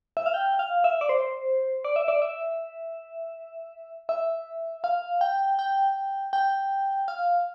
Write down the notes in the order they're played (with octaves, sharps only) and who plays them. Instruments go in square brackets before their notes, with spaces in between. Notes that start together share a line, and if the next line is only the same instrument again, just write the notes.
[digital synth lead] E5
F5
G5
F5
E5
D5
C5
D5
E5
D5
E5
E5
F5
G5
G5
G5
F5